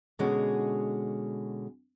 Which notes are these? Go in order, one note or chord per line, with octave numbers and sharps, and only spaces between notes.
B2 D3 G#3 C#4 F#4 G#4